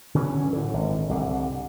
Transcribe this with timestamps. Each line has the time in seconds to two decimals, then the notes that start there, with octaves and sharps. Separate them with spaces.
0.15 D3 E3 F#3 C#4
0.53 A2 D3
0.73 G#1
1.09 C2 D3